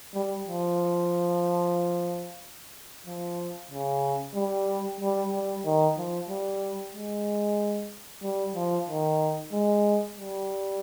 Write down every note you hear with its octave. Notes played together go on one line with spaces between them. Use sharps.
G3
F3
F3
C#3
G3
G3
G3
D#3
F3
G3
G#3
G3
F3
D#3
G#3
G3